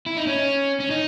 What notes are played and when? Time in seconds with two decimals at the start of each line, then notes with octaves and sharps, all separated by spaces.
0.06 E4
0.17 D#4
0.27 C#4
0.80 C#4
0.91 D#4